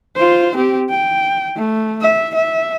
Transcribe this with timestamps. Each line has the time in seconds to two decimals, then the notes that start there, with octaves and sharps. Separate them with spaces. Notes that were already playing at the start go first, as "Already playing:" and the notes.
0.16 F4 C5
0.56 C4 G4
0.90 G5
1.56 A3
2.01 E5
2.35 E5